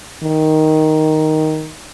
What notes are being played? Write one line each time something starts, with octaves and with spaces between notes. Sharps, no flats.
D#3